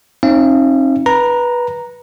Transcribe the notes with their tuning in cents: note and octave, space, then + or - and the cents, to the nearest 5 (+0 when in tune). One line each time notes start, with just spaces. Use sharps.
C4 +45 D#4 +0 F5 -40
B4 -15 A#5 +0